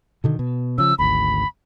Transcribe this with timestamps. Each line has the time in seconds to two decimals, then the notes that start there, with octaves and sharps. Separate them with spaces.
0.24 B2 D3 D#3
0.39 B2
0.78 C#3 F3 E6
0.99 G#1 D2 B5